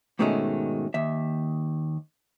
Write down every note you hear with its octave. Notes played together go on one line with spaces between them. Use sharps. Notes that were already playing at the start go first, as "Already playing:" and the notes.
G#2 B2 D#3 G#3 A3 C#4
D#2 E5